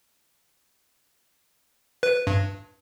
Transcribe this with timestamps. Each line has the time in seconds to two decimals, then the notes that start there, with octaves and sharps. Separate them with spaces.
2.03 B4
2.27 G2